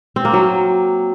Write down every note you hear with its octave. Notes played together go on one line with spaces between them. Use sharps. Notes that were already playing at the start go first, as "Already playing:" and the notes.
C4
A#3
F#3